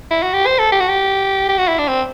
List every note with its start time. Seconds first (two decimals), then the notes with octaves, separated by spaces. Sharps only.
0.11 E4
0.23 F#4
0.33 G4
0.47 C5
0.59 A4
0.72 G4
0.80 F#4
0.88 G4
1.49 G4
1.58 F#4
1.69 E4
1.79 D4
1.88 C4